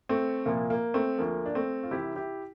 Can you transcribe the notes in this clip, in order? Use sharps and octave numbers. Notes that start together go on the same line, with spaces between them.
A3 C4
C2 A#2 F3 A#3
A#3
A3 C4
D2 D3 F3 A#3
D4
A3 C4
F4
C2 C3 E3 E4 G4
E4 G4